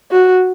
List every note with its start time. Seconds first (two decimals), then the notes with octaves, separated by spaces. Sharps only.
0.11 F#4